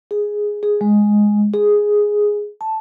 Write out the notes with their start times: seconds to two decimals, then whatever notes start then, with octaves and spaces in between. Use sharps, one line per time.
0.11 G#4
0.63 G#4
0.81 G#3
1.54 G#4
2.61 A5